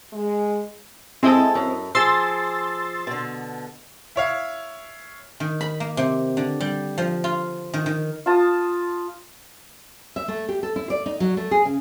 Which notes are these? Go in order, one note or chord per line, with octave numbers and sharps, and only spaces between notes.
G#3
G#3 C4 E4 A4 D#5
F#2
F3 G#4 C6 E6 A6
B2 D3
E4 C#5 F5
D#3
B5
A#3
C3
D3
G3
F3
F4
D#3
D#3
F4 A5 D#6
E5
A3
G4
A4
E4
D5
D#4
F#3
A3
G#4
C#3